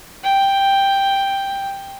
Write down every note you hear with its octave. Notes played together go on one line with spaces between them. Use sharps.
G5